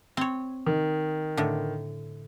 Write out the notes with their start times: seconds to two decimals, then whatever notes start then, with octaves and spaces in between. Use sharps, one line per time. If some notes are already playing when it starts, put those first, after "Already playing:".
0.17 C4 C#5
0.67 D#3
1.37 A2 D3